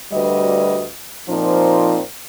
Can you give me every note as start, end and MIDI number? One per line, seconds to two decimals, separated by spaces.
0.12 0.87 38
0.12 0.87 55
0.12 0.87 66
0.12 0.87 71
0.12 0.87 75
1.29 2.00 46
1.29 2.00 53
1.29 2.00 60
1.29 2.00 63